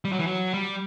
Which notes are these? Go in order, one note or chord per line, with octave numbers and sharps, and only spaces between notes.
G3
F#3
E3
F#3
G3